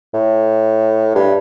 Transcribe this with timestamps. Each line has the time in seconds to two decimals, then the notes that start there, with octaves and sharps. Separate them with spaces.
0.14 A2
1.15 G2